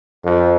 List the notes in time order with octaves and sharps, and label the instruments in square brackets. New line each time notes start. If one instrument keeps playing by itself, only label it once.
[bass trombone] F2